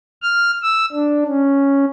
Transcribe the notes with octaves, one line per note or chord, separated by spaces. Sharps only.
F6
E6
D4
C#4